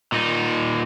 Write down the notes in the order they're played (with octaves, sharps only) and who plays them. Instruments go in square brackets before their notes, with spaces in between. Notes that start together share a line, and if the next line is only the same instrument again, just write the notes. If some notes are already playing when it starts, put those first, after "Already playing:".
[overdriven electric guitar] A#2 D#4